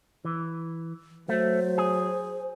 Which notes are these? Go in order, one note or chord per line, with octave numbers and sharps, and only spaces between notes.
E3
F#3 A3 C5
G#4